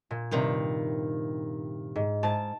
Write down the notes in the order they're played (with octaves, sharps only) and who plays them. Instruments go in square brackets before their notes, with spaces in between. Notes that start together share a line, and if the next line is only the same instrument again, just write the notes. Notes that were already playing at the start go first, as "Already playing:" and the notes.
[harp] A#2
[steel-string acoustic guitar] G2 C3 D#3
[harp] G#2
[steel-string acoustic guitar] G#2 [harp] A5 A6